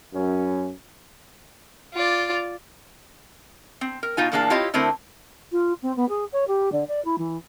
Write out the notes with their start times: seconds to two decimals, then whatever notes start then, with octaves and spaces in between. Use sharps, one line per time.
0.14 F#2 C#4
1.94 F4 D5
3.81 C4
4.03 A#4
4.17 B2 D#4 F4 G#5
4.32 A#2 E3 A#3 D4 G#4 A5
4.50 C4 E4 F4 G4 C#5 D#5
4.74 D3 A3 C4 E4 A#4
5.52 F4
5.82 C4
5.96 B3
6.09 G#4
6.32 C#5
6.48 G4
6.72 D3
6.88 D5
7.05 E4
7.18 E3